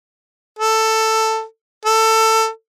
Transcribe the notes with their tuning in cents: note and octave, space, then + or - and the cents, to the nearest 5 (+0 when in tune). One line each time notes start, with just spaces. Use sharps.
A4 +10
A4 +20